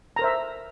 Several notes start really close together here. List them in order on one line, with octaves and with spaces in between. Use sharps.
A#5 A#4 C5 E5